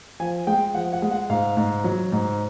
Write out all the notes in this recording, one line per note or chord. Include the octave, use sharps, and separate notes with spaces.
F3 G#5
G#3 G5
F3 F#5
F#5
G#3
F#5
G#2 F5
G#2
F#3
G#2